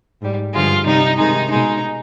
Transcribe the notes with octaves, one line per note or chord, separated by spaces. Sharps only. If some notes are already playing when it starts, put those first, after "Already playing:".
G#2 G3
G2 D3 F3 G#3 F4
C3 G3 D#4
C3 D#3 G#3 D#4
B2 G#3 D#4